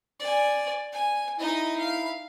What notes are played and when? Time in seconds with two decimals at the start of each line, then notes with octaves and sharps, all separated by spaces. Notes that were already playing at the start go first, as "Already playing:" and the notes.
0.20 D5 G#5
0.92 G#5
1.39 D#4 E4 D#5
1.79 F5